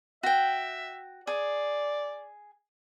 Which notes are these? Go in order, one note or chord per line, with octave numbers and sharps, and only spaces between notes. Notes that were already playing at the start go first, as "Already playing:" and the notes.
F#4 E5 G5
G#4 D5